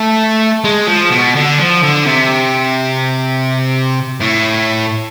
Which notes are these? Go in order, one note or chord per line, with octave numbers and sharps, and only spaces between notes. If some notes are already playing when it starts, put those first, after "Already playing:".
Already playing: A3
G#3
F3
B2
D3
F3
D3
C3
A2